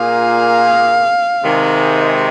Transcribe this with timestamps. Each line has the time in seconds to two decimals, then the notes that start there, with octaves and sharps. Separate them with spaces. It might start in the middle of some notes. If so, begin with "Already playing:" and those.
Already playing: A#2 A#3 G#4 F5
1.43 C3 D#3 G#3